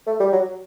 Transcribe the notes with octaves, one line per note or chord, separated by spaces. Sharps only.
A3
G3
F#3